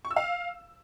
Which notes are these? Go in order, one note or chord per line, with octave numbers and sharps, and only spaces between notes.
C#6
E6
F5